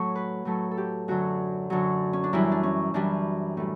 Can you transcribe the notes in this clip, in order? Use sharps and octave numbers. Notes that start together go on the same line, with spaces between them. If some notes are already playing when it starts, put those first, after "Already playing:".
Already playing: A2 F#3 A3 C#5
B4
A2 F#3 A3 A4
A4
G4
F#2 D3 F#3 F#4
F#2 D3 F#3
C#4
D4
F#2 E3 G3 E4
D4
C#4
F#2 E3 G3 D4
A2 G3